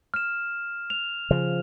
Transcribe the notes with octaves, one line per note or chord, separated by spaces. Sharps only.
F6 E7
F7
C#3 F3